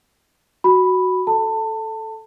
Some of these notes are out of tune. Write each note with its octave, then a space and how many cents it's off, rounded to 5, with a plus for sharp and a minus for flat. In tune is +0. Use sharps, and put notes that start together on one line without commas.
F#4 +0 B5 +0
A4 -10 A5 +25